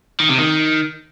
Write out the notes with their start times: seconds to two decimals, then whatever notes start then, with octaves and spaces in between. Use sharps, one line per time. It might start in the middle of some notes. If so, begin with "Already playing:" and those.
0.20 D#3
0.29 C3
0.39 D#3